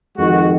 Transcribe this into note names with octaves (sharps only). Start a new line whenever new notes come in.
F2 D#3 G#3 F#4